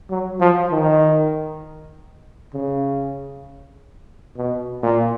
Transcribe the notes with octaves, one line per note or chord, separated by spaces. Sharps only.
F#3
F3
D#3
C#3
B2
A#2